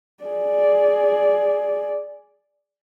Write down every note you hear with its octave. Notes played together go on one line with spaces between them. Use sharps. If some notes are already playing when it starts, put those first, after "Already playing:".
G#4 D5